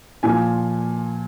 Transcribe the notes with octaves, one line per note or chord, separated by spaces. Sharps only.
A#2 F3 G#5